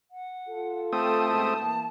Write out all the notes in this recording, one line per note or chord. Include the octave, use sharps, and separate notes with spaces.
F#5
F4 A4
A3 C4 A5 D#6
B2 G#3 E4 A5
E3 A#3